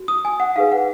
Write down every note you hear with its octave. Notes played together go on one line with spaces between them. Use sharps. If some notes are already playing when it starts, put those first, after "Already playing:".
Already playing: F#4
D#6
G#5
F#5
D#4 G#4 B4 F5
F#5